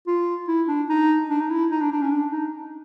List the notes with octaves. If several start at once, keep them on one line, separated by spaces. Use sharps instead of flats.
F4
E4
D4
D#4
D4
D#4
E4
D#4
D4
D4
C#4
D4
D#4